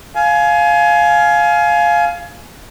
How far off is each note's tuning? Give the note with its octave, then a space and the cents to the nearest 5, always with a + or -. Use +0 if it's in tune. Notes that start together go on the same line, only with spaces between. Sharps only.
F5 +0 G#5 +25